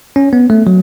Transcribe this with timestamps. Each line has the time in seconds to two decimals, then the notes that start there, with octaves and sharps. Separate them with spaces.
0.16 C#4
0.33 B3
0.50 A3
0.67 F#3